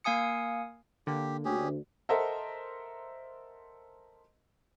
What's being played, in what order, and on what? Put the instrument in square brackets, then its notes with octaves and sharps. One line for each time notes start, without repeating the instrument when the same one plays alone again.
[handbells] A#3 F5 G#5 D#6 C#7
[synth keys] D3 A#3 [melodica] G4
[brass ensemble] D2 [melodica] C#4 G4 G#4
[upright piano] A4 A#4 C5 D#5 E5 F#5